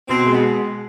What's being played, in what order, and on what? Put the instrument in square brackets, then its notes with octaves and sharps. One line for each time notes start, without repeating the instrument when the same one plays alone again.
[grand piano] B2 [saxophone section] C4
[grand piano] G#3
[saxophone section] B3